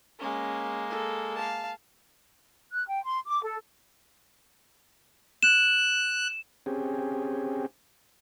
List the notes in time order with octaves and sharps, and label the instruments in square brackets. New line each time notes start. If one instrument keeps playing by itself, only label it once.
[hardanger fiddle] G#3 A#3 [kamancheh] C#4
[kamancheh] A4
F5 A5
[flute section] F#6
G5
C6
D6
A4
[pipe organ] F#6 [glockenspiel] E7
[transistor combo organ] C4 C#4 G4 G#4